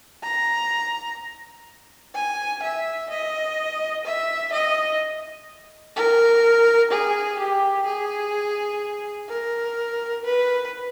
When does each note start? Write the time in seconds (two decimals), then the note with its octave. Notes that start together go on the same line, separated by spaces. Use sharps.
0.23 A#5
2.15 G#5
2.63 E5
3.10 D#5
4.05 E5
4.52 D#5
5.96 A#4
6.91 G#4
7.39 G4
7.86 G#4
9.29 A#4
10.24 B4